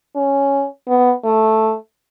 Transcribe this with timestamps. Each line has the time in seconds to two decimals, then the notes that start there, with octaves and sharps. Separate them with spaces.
0.16 C#4
0.88 B3
1.24 A3